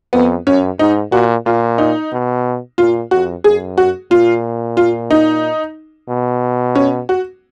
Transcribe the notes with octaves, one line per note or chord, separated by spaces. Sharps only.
F2 B3
F#2 C#4
G#2 D#4
A#2 F#4
A#2 F4
D#4
B2
A#2 F4
F2 F#4
F#2 G#4
F#4
A#2 F4
F4
D#4
B2
C#4
F#4